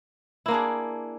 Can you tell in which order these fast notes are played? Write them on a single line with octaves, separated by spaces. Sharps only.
E4 A#3 D4 G#4